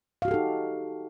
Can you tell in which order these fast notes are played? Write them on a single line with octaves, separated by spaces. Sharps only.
F5 F#4 G4 A4 D#4